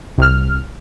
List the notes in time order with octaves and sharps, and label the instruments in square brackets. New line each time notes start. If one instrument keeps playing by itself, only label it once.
[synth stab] C2 F6